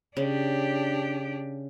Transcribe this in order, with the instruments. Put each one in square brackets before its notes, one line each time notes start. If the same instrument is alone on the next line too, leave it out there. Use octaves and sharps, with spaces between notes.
[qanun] C#3 [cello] D4 G4